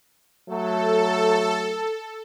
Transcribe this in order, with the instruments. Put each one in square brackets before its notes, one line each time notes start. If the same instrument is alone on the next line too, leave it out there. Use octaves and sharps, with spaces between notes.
[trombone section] F#3 A3 [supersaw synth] A4